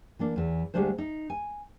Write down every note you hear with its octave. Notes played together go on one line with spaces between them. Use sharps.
E3 A#3 D4
E2 E3
D2 B2 G3 G#3 D4 C5
D#4
G#5